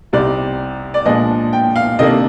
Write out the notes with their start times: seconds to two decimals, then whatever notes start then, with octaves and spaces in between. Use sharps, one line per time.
0.13 C2 C3 G3 C4 D#4 D5
0.94 D5
1.06 A#2 F3 G#3 D4 D#5
1.53 G5
1.76 F5
1.99 C3 D#3 A#3 D4 D#5